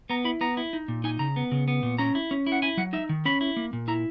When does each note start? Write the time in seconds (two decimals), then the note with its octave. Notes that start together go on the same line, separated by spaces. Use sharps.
0.10 B3 A#5
0.24 E4 B5
0.41 B3 A#5
0.57 E4
0.73 D#4
0.88 A#2
1.04 D#4 G#5
1.19 C#3 A#5
1.36 B3
1.52 C#3
1.68 B3
1.83 A#2
1.98 C#4 A#5
2.15 E4
2.31 C#4
2.47 E4
2.52 F#5
2.62 E4 G#5
2.77 F#3 F#5
2.93 D#4 E5
3.09 D#3
3.25 C#4 B5
3.41 E4
3.57 A#3
3.73 A#2
3.88 E4 A#5